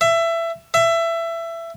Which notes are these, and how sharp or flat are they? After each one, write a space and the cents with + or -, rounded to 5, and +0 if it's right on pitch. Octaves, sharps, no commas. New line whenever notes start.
E5 +20
E5 +20